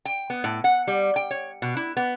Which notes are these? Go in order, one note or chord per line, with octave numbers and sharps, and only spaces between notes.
G5
B3
A2
F#5
G3
G5
C#5
B2
E4
B3